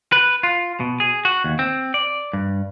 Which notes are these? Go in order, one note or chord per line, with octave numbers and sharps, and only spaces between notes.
B4
F4
B2
G#4
F#4
D#2
C4
D5
G2